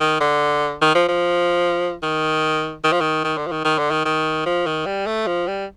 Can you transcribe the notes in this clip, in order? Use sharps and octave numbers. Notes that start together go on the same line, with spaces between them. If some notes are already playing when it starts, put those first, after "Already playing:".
D#3
D3
D#3
F3
F3
D#3
D#3
F3
D#3
D#3
D3
F3
D#3
D#3
D3
D#3
D#3
F3
D#3
G3
A3
F3
G3